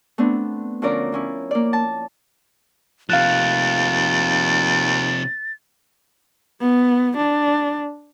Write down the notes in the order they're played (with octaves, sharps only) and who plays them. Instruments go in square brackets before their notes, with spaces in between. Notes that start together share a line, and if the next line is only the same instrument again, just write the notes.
[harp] A3 B3 C4 D4
D2 F3 C#4 A#4 D5 A#5
F3 C#4 E4
A#3 D5
A5
[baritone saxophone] D#2 [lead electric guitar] C3 F3 [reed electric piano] F5 F#6 [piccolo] A6
[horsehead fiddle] B3
D4